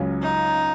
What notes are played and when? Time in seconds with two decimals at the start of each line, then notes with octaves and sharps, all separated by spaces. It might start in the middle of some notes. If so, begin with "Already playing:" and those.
Already playing: C#2 C#3 F#3 C#4
0.22 D#4